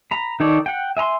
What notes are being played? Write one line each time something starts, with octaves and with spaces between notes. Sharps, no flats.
A#5 B5
D#3 D#4 A4 C#5 D5
F#5 G5
E5 G#5 A#5 C6